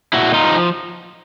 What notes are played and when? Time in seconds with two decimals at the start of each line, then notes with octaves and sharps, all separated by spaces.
0.13 A#2 E4 F#4
0.34 D#4 F4
0.44 F3